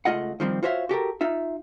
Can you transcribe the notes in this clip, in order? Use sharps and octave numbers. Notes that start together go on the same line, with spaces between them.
C#2 F#3 A3 F4 D#5 F#5
D#3 F3 G3 C4
F4 F#4 C5 C#5 E5 F5
F#4 G4 A4 A#4
D#4 F4 E5